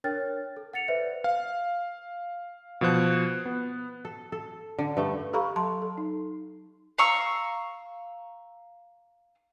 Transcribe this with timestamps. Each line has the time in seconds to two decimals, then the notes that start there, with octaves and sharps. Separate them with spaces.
0.04 D4 A#4 C#5 G5 F6 A6
0.57 A4
0.73 F#5 A6 C#7 F7
0.88 B4 C5 D5 E5
1.24 F5
2.81 B2 F3 C5 F#6
3.46 B3
4.05 A4
4.32 A4
4.79 D3
4.97 G2 A3
5.33 G4 A4 F5 A#5 B5 C#6
5.56 F#3 A5 C6
5.82 A4
5.97 D#4
6.98 F5 A#5 C#6 E6